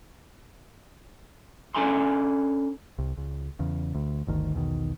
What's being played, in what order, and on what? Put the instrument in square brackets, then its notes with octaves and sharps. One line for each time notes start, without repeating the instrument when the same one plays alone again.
[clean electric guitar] C#4 D4 A4 G#5 A#5 C6
[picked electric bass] C2
C#2
E2 C#3
D2
G1 D2 D#3
B1 E2 B2 D#3